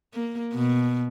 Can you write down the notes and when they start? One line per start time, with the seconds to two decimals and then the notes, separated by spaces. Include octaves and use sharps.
0.14 A#3
0.54 B2